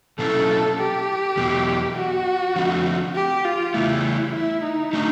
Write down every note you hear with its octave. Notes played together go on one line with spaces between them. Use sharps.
B2 F#3 A#3 C#4 E4 A4
G4
E2 B2 F#3
F#4
D3 F3 A3 C4
G4
F4
C#3 E3 A3 E4
E4
D#4
F#3 A3 D4